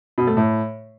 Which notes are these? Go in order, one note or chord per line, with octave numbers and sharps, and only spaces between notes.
B2
A3
A2